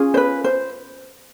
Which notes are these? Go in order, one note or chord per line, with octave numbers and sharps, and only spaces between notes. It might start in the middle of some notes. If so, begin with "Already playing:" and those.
Already playing: C#4 F4 G#4
C5
B4
C5